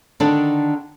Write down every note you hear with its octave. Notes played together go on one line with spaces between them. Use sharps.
D3 D#3 D4 A4